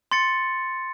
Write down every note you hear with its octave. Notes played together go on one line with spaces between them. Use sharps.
C6 A6 C#7